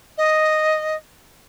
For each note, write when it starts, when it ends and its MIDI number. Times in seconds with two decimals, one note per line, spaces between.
0.17 0.96 75